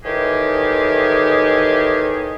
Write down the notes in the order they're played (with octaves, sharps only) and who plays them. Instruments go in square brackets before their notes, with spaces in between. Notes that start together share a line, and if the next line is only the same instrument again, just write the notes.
[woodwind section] A2 D#3 E3 G4 G#4